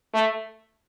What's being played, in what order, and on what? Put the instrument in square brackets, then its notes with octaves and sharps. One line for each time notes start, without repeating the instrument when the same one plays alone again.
[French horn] A3